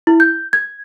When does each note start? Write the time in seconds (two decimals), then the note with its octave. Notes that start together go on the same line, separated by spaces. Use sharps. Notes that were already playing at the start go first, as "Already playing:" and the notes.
0.07 E4
0.20 G6
0.53 G#6